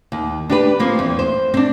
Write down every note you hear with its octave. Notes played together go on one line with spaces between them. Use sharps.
D#2
D4 G4 B4
F3 A#3 C4
E2
C5
C4 D4